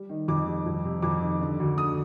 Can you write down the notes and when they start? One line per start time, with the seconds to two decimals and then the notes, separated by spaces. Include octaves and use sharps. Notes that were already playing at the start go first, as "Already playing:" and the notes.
Already playing: G3
0.09 D#3
0.28 F2 D6
0.47 G3
0.66 F2
0.85 C3
1.02 F2 D6
1.21 D#3
1.41 D3
1.59 D2
1.78 D3 D#6